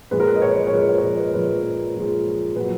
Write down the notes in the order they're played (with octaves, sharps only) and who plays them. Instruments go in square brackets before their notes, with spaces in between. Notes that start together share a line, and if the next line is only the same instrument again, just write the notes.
[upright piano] A#2 F3 G#3 B4
A#4
B4
D#5
C#5
C#5
A#2 F3 G#3 B4
C#5
C#5
D#5
B4
A#2 F3 G#3 B4
A#2 F3 G#3
A#2 F#3 B4